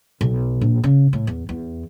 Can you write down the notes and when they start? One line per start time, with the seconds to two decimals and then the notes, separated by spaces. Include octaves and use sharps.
0.21 B1
0.61 A#1
0.84 C#3
1.13 A2
1.27 E2
1.49 E2